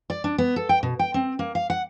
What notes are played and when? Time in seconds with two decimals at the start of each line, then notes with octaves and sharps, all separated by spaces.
0.10 D5
0.24 D4
0.38 B3
0.56 A4
0.69 G5
0.83 B2
0.99 G5
1.14 C4
1.39 A#3
1.55 F5
1.70 F#5